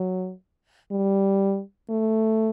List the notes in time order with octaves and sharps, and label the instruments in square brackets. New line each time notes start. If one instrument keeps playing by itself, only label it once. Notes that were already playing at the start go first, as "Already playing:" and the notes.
Already playing: [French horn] F#3
G3
A3